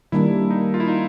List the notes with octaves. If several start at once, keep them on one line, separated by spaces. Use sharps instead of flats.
D#3 G3 A#3 D4 E4
D#4
F4
E4
D#4